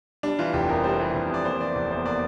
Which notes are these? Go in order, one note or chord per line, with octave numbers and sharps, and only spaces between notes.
G3 D4
E3 F4
F1 G4
F2 A#4
G3 C5
E3
F1
F2 D5
A#3 C5
E3 D5
F1 D5
E2 C5
A#3 D5